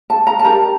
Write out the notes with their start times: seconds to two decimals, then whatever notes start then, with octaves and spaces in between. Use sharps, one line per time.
0.10 A5
0.27 A#5
0.39 A5
0.44 D4 G4 A#4 A#5